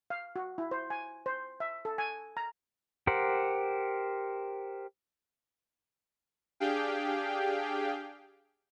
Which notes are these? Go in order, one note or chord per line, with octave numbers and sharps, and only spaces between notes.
F5
F#4
E4
C5
G#5
C5
E5
A4
G#5
A#5
G4 A#4 C5 F#5
D4 G4 G#4 F5 G5